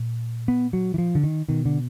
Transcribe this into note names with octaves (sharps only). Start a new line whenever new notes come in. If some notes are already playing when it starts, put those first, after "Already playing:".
Already playing: A#2
B3
F#3
E3
F3
D3
D#3
B2 D#3
D3